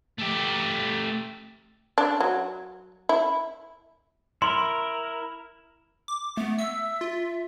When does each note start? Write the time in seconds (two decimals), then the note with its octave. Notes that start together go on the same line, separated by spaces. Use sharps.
0.18 A3 G4
1.98 D4
2.20 F#3
3.09 E4
4.42 E4 A#4 C6
6.08 D6
6.37 A3 B3
6.59 E5 E6
7.01 F4